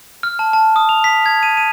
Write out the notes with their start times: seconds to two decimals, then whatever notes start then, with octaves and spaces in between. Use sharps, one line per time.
0.23 F6
0.39 A5
0.53 A5
0.76 D#6
0.89 F7
1.04 B6
1.26 G#6
1.43 D#7
1.57 D#7